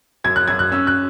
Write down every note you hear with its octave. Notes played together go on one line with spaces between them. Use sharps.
F#2 G#6
F#6
F#2 G#6
F#6
C#4 E6
F#6